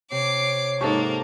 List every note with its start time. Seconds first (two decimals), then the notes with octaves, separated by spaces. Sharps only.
0.12 C3 C#5 D6 C7
0.81 G#2 A#3 G4 A4 A5 C#6